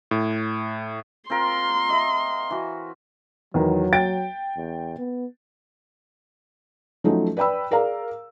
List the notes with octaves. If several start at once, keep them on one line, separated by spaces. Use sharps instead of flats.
A2
C4 F4 A#4 C6
D#5 E5
E3 F#4
E2 D#3 F#3
G5 A6 D7
E2
B3
F3 F#3 A3 C#4 D#4 A4
B4 D5 G5 B5 E6
G#4 A#4 D5 F5 A#5